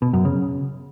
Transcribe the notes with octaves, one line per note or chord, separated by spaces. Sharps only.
B2
F#2
C#3